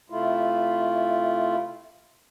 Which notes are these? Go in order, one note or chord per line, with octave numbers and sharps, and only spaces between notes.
C3 A3 E4 F4